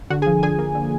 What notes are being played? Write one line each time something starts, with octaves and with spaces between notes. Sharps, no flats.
D3 F#4 F#5
G#4 G#5
F3
D3 G#4 G#5
A#3
D3